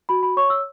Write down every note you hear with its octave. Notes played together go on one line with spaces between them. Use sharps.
F#4 B5
B5
C#5 C#6
E6